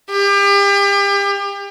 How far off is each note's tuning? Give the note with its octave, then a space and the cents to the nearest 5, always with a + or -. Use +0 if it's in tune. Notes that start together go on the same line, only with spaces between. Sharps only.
G4 +35